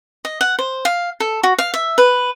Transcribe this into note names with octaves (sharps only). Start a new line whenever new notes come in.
D#5
F#5
C5
F5
A4
F#4
F5
E5
B4